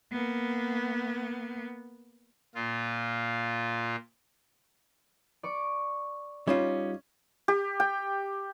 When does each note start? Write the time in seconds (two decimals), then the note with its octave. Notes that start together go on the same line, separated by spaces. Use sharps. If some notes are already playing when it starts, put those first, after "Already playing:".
0.12 A#3 B3
2.55 A#2 F4
5.43 D5 C#6 D6
6.48 G3 C#4 D#4 F4 E7
7.48 G4
7.80 G5